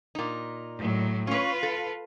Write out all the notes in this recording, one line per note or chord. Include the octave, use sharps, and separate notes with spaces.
A#2 D#4
A2 F#3
C#4 F4 B4 C#5
A4